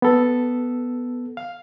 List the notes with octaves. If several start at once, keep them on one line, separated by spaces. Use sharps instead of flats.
B3 A4
F5